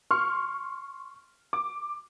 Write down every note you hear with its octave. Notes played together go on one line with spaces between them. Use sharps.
C6 C#6 F6
D6